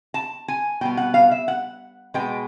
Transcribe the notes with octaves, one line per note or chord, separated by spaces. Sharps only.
A5
G#5
B2 G3 B3 G5
F#5
F5
E5
F#5
B2 G#3 B3 G5